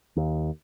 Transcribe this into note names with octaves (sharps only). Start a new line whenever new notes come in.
D#2